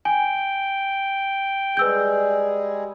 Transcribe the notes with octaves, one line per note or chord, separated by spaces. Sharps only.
G5 G#5
G3 G#3 G#4 B4 E6 G6